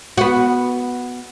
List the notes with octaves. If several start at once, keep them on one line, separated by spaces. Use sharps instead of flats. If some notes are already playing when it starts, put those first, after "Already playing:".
B3 F#4